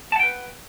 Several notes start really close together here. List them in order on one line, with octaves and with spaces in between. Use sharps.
A5 F#5 G5 B4